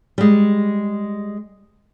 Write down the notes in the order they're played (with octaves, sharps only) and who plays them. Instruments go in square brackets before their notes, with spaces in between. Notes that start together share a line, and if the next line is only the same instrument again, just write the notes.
[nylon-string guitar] G3 G#3